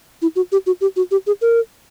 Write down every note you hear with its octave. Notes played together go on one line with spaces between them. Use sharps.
E4
F#4
G4
F#4
G4
F#4
G4
G#4
A#4